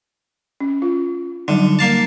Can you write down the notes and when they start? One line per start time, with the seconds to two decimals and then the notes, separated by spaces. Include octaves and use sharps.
0.60 C#4
0.82 F4
1.48 D3 F#3 G3 D#4
1.79 A#3 F5 A5